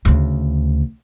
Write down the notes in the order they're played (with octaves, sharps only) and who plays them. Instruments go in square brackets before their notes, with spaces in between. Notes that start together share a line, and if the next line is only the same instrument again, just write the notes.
[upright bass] D2 C#3